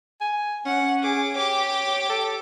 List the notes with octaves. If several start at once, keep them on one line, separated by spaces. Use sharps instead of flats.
G#5
C#4 F#5
G#4 D6
G4 C#5 D6
A4